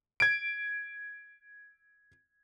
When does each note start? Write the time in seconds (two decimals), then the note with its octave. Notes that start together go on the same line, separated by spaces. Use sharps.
0.20 G#6 D7